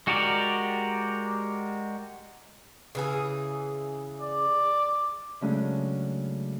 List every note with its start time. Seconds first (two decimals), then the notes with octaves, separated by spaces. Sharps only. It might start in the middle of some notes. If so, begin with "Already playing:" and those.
0.07 G#3 F#4 G4 A#4 D5
2.95 C#3 E3 G#4
4.21 D5
5.41 C#3 F#3 G#3 A3 C#4 D4